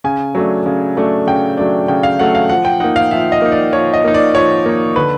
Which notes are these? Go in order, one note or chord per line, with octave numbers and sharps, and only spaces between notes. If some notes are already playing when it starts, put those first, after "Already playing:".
C#3 G#5
F#3 A3 D4
C#3
F#3 A3 D4
C#3 G5
F#3 A3 D4
C#3 G5
F5
F#3 A3 D4 F#5
F5
F3 F#5
G5
A#3 D#4 F#5
F5
F3 E5
D#5
A#3 D#4
D5
F3 C#5
D#5
A#3 D#4
D5
F3 C#5
A#3 D#4
D3 B4